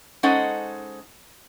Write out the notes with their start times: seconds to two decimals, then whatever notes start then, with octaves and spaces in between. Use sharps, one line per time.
0.23 G#3 C#4 D#4 A4 C5 F#5